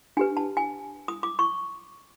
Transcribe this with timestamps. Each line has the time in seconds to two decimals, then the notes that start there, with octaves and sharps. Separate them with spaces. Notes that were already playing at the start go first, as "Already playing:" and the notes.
0.17 D4 G4 B4 G#5
0.37 A5
0.57 G#5
1.08 D#6
1.23 D6
1.39 C#6